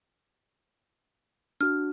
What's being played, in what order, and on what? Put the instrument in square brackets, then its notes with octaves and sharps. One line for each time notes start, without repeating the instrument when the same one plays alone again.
[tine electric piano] D4 F#4 [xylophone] F6